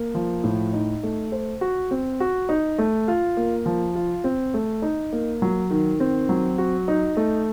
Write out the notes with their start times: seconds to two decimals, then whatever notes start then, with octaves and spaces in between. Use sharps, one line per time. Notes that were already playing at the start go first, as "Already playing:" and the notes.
Already playing: A#3
0.15 F3
0.44 A2
0.73 D#4
1.03 A3
1.32 C5
1.61 F#4
1.91 C4
2.20 F#4
2.49 D#4
2.78 A3
3.08 F4
3.37 A#3
3.66 F3
3.95 F4
4.24 C4
4.54 A3
4.82 D#4
5.13 A#3
5.42 F#3
5.71 D#3
6.00 C4
6.29 F#3
6.58 F#4
6.88 D#4
7.17 A3